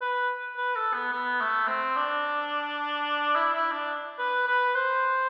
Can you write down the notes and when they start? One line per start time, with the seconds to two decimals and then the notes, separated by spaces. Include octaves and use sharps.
0.02 B4
0.57 B4
0.76 A4
0.94 B3
1.12 B3
1.41 A3
1.68 C4
1.97 D4
3.36 E4
3.55 E4
3.72 D4
4.19 B4
4.47 B4
4.75 C5